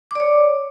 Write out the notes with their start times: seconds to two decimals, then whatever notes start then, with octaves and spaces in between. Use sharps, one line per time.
0.11 D6
0.15 D5
0.20 C#5